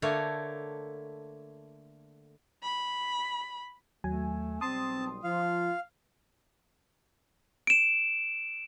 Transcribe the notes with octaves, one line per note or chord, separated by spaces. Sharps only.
D3 A3 A#3 C#5
B5
D#2 F#3 A3 G#5
B1 G3 C4 A5 C6 D#6
F3 F4 F5
D7 E7